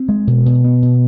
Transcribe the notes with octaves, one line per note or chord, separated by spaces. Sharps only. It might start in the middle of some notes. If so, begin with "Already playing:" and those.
Already playing: C4
G#3
B2
B2
B3
B2